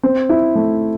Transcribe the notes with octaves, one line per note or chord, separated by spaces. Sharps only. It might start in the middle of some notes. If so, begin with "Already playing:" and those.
C4
E4
A3